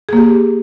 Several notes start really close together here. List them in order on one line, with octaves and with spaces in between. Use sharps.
G#4 A#3 G4